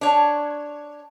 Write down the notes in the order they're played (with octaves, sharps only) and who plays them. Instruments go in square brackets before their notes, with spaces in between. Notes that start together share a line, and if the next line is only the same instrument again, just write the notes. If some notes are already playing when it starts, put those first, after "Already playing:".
[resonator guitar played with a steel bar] D4 C#5